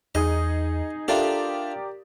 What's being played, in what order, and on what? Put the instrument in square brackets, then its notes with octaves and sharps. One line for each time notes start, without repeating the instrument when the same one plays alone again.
[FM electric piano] E2 [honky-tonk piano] D#4 G#4 D#6 [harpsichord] D#5
[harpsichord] D4 F4 [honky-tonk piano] G4 A#4 D5 [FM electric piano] A4 E5